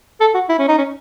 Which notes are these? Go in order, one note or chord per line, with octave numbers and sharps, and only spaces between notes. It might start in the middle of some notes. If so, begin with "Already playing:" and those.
A4
F#4
E4
C#4
D#4
C#4